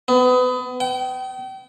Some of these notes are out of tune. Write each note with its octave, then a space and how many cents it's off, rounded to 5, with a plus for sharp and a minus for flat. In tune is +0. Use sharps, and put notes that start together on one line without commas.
B3 +30
G5 -35